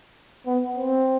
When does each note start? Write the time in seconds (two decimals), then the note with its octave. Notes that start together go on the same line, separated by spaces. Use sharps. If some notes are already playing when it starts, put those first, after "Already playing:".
0.46 B3
0.76 C4